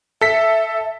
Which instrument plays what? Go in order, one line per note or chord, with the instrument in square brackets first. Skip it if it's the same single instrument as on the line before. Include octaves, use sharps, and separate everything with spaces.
[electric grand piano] A4 B6 [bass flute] E5